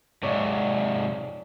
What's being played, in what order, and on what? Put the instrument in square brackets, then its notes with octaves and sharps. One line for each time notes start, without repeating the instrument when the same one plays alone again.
[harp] F2 C#5 D5 [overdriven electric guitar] G#2 C3